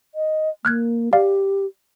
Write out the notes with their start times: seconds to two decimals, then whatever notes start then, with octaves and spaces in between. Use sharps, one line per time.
0.15 D#5
0.65 A#3 F6 F#6 G#6
1.13 G4 D5 F5